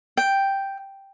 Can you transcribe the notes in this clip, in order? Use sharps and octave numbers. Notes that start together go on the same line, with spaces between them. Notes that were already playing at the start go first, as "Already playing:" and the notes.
G5